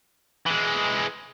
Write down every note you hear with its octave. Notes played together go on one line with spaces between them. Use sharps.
E3 G#3